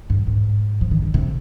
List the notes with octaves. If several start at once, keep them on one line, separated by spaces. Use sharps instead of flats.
G2
G#2
F3
D#3
D3
C3